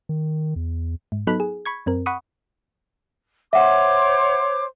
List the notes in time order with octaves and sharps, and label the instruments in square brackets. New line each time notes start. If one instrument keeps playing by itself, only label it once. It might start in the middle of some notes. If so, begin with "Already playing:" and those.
[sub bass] D#3
E2
[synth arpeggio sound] G#2
F#3 B3 D#4 A4 B5 F#6
G#4
B5 C#6 G#6
F#2 C4 A#4
F#5 B5 C#6 D#6
[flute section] C5 C#5 D6 [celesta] E5 F#5